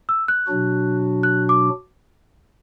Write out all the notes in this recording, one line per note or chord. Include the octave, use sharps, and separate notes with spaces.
E6
F#6
B2 F#3 D4 F#4
F#6
D6